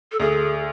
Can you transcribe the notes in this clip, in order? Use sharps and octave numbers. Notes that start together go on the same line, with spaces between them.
A4
D2 G#4